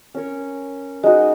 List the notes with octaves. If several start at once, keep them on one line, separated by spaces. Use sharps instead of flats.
C#4 A#4 C#5
G#3 D#4 F#4